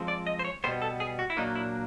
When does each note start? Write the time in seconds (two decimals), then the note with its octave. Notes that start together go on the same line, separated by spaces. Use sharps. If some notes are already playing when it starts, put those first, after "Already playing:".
Already playing: F3 G#3 C4
0.08 D5
0.27 D#5
0.39 C5
0.45 C#5
0.64 B2 G3 B3 C5
0.82 A4
1.00 G#4
1.19 F#4
1.30 E4
1.37 A#2 F#3 A#3 D4 D#4
1.55 E4